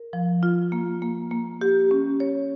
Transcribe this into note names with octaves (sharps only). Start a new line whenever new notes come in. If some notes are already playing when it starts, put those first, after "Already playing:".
Already playing: A#4
F3
F4
A#3
A#3
A#3
G4
C#4
C#5